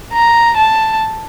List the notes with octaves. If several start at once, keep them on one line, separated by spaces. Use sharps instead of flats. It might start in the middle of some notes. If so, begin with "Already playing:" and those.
A#5
A5